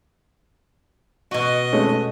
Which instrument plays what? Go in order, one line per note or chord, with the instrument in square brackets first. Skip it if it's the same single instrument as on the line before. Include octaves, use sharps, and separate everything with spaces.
[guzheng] B2 F#4 [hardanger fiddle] D#5
[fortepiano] G#3 A3 C#4